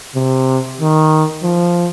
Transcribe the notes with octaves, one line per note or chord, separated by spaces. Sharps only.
C3
D#3
F3